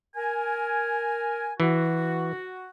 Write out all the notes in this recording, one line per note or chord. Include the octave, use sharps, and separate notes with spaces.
A#4 G#5
E3 F#4